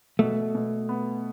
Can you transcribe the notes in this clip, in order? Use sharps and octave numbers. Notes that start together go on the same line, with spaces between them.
B2 A3
B2
B3